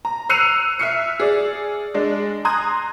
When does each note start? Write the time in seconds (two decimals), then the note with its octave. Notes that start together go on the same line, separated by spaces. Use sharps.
0.05 A#5
0.29 E6 F#6 C7 C#7 D#7 F7
0.79 E5 E6 F6 C7 C#7
1.20 G#4 D5
1.94 G#3 D4
2.45 A#5 C6 D#6 F#6 G#6